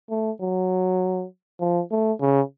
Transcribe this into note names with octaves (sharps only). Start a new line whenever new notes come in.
A3
F#3
F3
A3
C#3